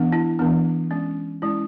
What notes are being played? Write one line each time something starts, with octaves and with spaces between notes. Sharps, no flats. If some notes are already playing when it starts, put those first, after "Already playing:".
Already playing: E3 B3 D4
E4
E3 B3 D4
G#3 C#4
G#3 C#4 E4